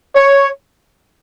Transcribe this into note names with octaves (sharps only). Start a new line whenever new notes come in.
C#5